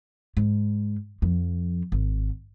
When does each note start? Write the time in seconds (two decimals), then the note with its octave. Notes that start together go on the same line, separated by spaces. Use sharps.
0.37 G#2
1.22 F2 F3
1.92 G#1